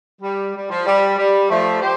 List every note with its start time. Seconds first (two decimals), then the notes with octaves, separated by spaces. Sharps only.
0.22 G3
0.54 G3
0.69 F3
0.85 G3
1.17 G3
1.49 F3 A3
1.80 G4 C5